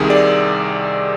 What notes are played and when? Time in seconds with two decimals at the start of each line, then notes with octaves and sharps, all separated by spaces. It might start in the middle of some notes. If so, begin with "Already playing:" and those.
Already playing: C2 C3 D#3 G#4
0.10 D5